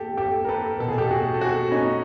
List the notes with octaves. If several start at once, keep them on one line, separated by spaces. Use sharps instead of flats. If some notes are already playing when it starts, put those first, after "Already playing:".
Already playing: G4 A4
G4 A4
A#4
A4 B4
B2 A4
G#4
G4 A4
F#4 G#4
A4
F#4 G#4
C#4 D#4